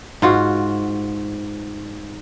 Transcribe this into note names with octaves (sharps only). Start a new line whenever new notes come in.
G#2 F4 F#4